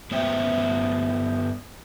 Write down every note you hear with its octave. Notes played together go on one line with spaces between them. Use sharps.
G2 B3 C5 E5 G5 A#5